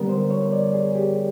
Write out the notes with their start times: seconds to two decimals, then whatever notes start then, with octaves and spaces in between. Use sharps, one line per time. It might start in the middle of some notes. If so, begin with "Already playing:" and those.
Already playing: D3 G3 B3 A#4
0.09 C5
0.31 C#5
0.52 D5
0.74 G#4
0.95 G4